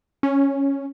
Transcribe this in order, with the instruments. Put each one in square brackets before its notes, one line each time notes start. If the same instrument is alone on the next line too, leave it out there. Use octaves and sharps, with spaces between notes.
[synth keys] C#4